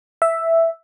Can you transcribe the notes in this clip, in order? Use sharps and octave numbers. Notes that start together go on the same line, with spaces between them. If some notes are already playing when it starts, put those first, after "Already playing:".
E5